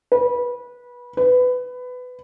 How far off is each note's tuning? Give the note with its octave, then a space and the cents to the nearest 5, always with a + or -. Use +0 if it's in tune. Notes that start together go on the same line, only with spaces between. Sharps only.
B4 -20
B4 +20